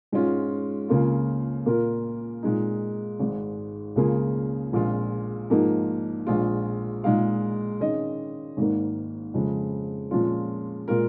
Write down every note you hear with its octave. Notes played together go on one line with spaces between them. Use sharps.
G#2 G#3 C#4 F4
C#2 C#3 A#3 F4
A#2 A#3 F4 A#4
A#2 G#3 D#4
G#1 G#2 G#3
C#2 C#3 A#3 F4 G#4
A#1 A#2 G#3 F4
G#2 F3 A#3 D#4 G#4
A#1 A#2 G#3 F4
A#2 G#3 D#4 G#4 F5
D#3 C#4 G#4 D#5
G#1 G#2 D#3 A#3
F2 C#3 G#3
A#2 F3 G#3 C#4 F4
A#2 G#3 F4 A#4